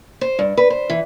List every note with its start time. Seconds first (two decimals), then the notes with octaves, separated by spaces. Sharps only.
0.21 C5
0.39 G2
0.57 B4
0.70 C5
0.90 E3